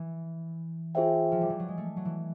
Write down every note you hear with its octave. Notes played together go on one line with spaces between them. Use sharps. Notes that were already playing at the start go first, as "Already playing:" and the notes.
Already playing: E3
F4 G#4 C5 E5 G5
F3
G3
E3
F#3
G#3
A3
F#3
E3